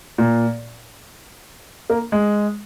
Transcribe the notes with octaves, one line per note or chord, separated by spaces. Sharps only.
A#2
A#3
G#3